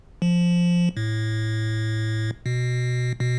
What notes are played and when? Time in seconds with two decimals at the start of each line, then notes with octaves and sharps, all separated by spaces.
0.22 F3
0.97 A2
2.46 B2
3.20 B2